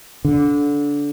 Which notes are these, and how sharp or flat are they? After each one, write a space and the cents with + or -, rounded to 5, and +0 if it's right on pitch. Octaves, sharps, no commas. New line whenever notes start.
D3 -20